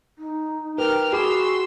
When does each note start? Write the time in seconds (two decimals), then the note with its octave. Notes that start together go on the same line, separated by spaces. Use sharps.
0.18 D#4
0.78 G4 A#4 B4 F6
1.13 F#4 G#4 B5 C6 D6 E6